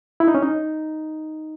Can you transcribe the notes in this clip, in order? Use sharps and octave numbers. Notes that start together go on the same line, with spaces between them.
E4
D#4
C#4
D#4